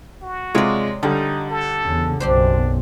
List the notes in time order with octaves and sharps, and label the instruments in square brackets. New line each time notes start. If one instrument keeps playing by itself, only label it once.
[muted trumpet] F#4
[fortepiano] C3 G#3 F4 [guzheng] C#5 D5
[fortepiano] D3 G3 [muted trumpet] D#4 [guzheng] F4
[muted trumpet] A4
[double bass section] E2 C#3
[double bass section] B1 F#2 [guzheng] C4 G4 C5 [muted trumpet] D4